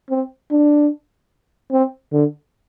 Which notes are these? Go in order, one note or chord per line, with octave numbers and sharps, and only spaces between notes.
C4
D4
C4
D3